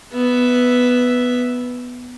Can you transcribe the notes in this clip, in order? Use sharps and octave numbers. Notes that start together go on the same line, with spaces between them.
B3 E5